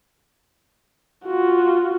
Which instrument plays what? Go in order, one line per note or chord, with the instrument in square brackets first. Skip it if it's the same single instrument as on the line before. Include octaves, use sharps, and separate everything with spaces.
[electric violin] F4 F#4